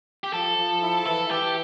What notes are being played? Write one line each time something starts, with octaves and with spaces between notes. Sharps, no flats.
G4
F3 A4
F3
E4
E3 A4
E3 G4